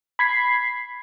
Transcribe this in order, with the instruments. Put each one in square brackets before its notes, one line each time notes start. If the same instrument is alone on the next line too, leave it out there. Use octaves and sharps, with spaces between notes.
[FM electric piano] B5 G#6 B6 C7